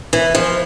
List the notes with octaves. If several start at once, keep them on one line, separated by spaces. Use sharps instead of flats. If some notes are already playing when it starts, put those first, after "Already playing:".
E3
F3